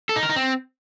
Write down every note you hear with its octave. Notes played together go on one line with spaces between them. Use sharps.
A4
D#4
A#4
D#4
C4